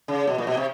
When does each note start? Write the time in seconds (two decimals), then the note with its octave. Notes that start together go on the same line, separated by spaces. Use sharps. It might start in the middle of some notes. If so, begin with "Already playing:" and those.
0.08 C#3
0.27 B2
0.38 A#2
0.47 B2
0.57 C3